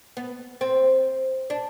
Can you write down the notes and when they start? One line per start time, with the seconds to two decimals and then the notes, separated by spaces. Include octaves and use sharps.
0.17 B3
0.61 C4
1.50 D4